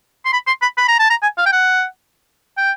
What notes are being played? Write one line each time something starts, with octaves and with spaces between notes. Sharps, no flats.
C6
B5
C6
B5
B5
A#5
A5
A#5
G#5
F5
G5
F#5
G5